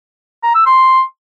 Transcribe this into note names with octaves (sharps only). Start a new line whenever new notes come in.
A#5
E6
C6